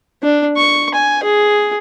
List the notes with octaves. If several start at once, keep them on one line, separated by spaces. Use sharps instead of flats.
D4
C#6
G#5
G#4